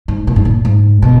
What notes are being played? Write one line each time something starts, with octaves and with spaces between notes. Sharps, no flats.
G#2
A#2
G#2
A#2
G#2
B2